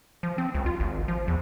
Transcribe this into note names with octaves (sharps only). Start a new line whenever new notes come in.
F3
C4
C#2
F4
G#1
F3
E2